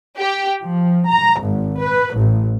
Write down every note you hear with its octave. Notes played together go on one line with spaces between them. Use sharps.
G4
F3
A#5
G#1
B4
A1